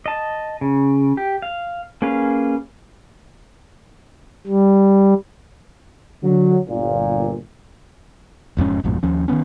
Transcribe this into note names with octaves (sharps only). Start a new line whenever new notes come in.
D#5 A5
C#3
G4
F5
A#3 C#4 G#4 B4 F5
G3
D3 F#3
G1 A#2
E1 F2 G#2 C#4
A1 F2 G#2 B2
D#2 F3 C#4
D#3 E3 B3 C#4